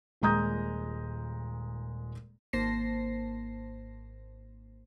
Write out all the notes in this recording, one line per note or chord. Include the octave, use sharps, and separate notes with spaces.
D#1 A#2 G#3 A#5 D#6 G6
G#1 A#3 C5 A5 A#6 C7